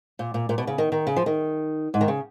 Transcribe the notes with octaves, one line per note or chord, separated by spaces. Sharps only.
A#2
A#2
A#2
B2
C#3
D#3
D#3
C#3
F3
D#3
G#2
D#3
C#3